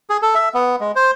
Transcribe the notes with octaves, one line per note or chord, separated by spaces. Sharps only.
G#4
A4
E5
B3
G#3
C5